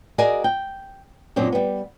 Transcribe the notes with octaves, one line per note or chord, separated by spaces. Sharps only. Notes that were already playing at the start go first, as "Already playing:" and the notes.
F#4 G#4 A#4 D5 D#5 G#5
G5
F#2 A#2 F#3 C4 D4
G3 B3